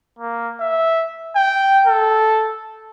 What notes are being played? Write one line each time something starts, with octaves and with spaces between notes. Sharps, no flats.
A#3
E5
G5
A4